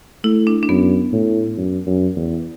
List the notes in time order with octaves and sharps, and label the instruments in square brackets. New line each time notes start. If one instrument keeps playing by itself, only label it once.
[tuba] A3 [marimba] E4
[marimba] D4
D4
[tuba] F#2 [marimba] B3
[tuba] A2
F#2
F#2
E2